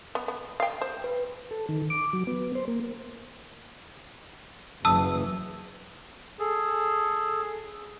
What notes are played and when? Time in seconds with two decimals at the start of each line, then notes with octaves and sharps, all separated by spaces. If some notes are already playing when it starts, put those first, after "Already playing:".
0.15 B3
0.28 B3
0.60 F5 G5
0.81 C5
1.04 B4
1.51 A4
1.69 D#3
1.90 D6
2.13 F#3
2.27 B3
2.55 C5
2.68 A#3
4.85 F#1 E2 E3 A5 D#6 E6
6.39 G#4 A4